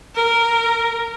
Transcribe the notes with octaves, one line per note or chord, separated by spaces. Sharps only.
A#4